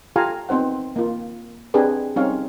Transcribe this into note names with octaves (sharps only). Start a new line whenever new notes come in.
F4 G4 A4 F5 G#5 A#5
B3 C4 D#4 C5 F#5
A#3 F4
C4 D4 G4 G#4 B4
G3 C4 C#4 D#4 C#5 F5